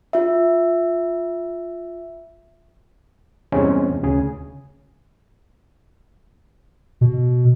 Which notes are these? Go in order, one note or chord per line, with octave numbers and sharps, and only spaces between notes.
F4 E5
E2 G2 C3 G#3 C4 C#4
D2 C#3 G#4
B2